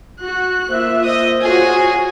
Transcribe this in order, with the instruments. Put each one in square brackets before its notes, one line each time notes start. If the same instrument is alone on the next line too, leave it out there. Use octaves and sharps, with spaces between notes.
[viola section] F#4 [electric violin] F#6
[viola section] A#3 F4 E5 [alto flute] C5
[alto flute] C5 [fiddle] D#5 D#6
[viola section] F4 F#4 [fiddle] G#4 C#5 [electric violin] G#5